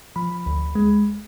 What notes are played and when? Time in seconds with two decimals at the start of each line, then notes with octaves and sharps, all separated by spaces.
0.16 F3 B5
0.46 D2
0.75 G#3